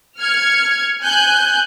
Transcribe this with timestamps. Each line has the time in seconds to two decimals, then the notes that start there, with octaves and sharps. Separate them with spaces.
0.19 F6 G#6 C#7
1.03 G#5 F#6 G6